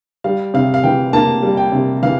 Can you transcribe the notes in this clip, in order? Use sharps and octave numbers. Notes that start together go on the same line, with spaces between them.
G3 F5
C3 F5
F5
E3 G5
A#3 A5
G3
G5
C3
E3 F5